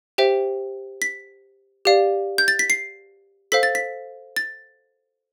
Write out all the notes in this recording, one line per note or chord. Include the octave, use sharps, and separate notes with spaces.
G4 C5 E5 G5
B6
G4 D5 F5
G6
A6
B6
C7
A4 C5 F5 B6
A6
B6
A6